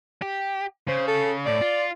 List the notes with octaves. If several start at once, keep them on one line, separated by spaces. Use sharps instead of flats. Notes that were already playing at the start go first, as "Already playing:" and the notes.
G4
C#3 C5
A4
A2 D5
F4